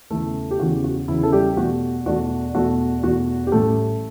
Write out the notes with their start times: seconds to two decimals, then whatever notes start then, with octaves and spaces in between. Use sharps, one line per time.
0.10 E2 C#3 E3 A3 A4
0.51 G4
0.59 E2 C#3 E3 F#4
0.84 F#4
1.08 E2 C#3 E3 E4
1.23 A4
1.33 G3 G4
1.57 E2 B2 A3 D4 F#4
2.06 E2 B2 A3 D4 F#4
2.54 E2 B2 A3 D4 F#4
3.04 E2 B2 A3 D4 F#4
3.47 G4
3.52 A1 A2 G3 A3 C#4 A4